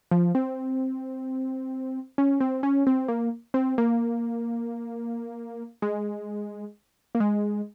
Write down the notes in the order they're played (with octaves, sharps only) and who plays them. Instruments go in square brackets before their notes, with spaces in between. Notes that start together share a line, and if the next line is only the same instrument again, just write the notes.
[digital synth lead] F3
C4
C#4
C4
C#4
C4
A#3
C4
A#3
G#3
A#3
G#3